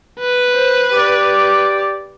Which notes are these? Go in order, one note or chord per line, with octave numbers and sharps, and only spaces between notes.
B4
C5
G4 D5